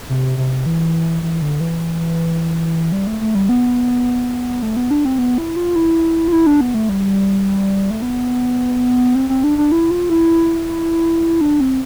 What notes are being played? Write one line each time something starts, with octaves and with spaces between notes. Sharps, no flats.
C3
C3
E3
E3
D3
E3
G3
A3
A3
G3
B3
A3
B3
D4
C4
B3
E4
F4
E4
F4
E4
D4
B3
A3
G3
A3
B3
C4
C4
D4
D4
E4
F4
E4
D4
C4